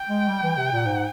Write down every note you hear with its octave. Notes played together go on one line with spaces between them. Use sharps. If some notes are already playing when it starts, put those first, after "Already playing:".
Already playing: G5
G#3
G3
E3
C3
A#2
G#2